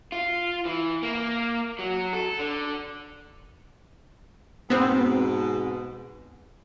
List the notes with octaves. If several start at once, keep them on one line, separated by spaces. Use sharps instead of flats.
F4
E3
A#3
F#3
A4
D3
G#2 B2 B3 C4